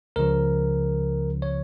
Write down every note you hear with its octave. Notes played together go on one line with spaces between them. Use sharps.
C#2 C#3 F3 A#4
C#5